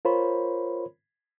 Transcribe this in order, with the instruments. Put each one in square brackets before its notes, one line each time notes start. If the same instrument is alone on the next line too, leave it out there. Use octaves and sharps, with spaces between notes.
[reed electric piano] F4 A#4 C5 C#5 B5